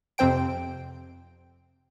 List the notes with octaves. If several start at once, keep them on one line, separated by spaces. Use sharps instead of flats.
F2 C3 C4 C5 G5 D7